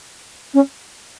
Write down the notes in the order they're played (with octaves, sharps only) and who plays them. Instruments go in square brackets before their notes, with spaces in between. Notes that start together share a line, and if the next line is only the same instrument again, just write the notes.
[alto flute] C#4